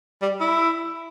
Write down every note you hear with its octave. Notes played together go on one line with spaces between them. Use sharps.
G3
E4